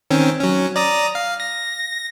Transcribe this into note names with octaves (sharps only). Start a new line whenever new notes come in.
D#3 C4 C#4
F#3 C#4
D5 A#5 D#6
F5
A#6